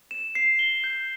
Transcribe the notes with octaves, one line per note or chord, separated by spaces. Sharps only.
E7
C7
G7
G6